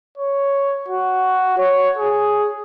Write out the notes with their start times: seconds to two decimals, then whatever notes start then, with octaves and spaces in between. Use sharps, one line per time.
0.17 C#5
0.88 F#4
1.57 C#5
1.97 G#4